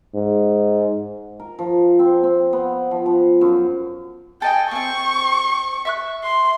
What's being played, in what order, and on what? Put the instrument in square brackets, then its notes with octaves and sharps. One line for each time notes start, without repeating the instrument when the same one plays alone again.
[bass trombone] G#2
[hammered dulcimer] A#4
F3
C4
C4
B3
F3
F3
F#2
[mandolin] A4 D#5 G#5 [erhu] G5
[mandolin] A#3 C4 [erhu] C#6
[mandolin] E5 C#6 F#6
[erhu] C6